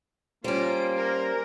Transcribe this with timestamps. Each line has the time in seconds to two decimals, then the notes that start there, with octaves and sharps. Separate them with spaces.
0.44 G3 A#3 C#4 F4 C5 D7
0.97 A#4